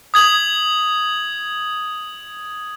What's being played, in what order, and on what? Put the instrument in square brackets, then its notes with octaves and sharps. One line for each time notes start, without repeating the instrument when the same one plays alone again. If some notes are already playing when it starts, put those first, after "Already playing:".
[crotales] D#6 G#6 F#7